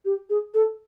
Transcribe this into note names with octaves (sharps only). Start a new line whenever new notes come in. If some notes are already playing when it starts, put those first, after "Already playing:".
G4
G#4
A4